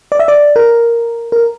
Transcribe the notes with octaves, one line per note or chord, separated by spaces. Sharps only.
D5
E5
D5
A#4
A#4